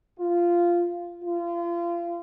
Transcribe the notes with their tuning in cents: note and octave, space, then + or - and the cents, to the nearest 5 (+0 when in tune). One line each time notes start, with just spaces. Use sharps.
F4 -10
F4 -30